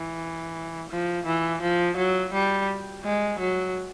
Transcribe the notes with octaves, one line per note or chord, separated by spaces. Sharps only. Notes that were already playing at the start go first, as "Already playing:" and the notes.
Already playing: E3
F3
E3
F3
F#3
G3
G#3
F#3